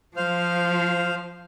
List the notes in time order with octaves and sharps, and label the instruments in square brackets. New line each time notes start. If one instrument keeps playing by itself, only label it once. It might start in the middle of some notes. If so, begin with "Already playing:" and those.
[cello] F3 [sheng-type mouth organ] C5 F5 F6